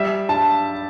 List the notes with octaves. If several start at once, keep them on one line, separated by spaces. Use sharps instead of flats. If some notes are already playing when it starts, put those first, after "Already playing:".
Already playing: G3 E5
G2 A5